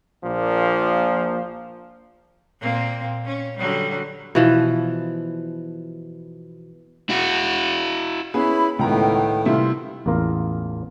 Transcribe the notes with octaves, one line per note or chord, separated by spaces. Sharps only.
A#1 A#2 F3 A#3
A#2 A#3 C4
C#4
D3 F#3 G3
B2 E3 F3
E4 F#4
B3 C#4 E4 G#4 B5
C#2 A2 D#3 B3 G5 A#5
C3 G3 E4 F4
A1 E2 A#3 F4 A#4 F5